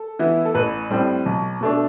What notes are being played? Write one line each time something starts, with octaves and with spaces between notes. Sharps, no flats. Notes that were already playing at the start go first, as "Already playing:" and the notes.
Already playing: A4
E3 B3 E4
A4
A1 B4
A2 G3 C4
B1
B2 A3 D4